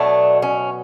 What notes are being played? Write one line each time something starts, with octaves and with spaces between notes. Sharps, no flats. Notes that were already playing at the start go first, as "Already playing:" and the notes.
Already playing: B2 F#3 A3 D4
C#4